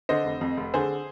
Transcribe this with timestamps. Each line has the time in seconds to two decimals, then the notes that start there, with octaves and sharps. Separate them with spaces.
0.09 D3 C5 D#5
0.25 F1
0.41 F2
0.57 F1
0.74 D3 G#4 C5